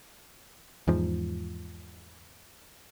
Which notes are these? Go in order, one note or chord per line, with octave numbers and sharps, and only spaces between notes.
E2 G#2 F3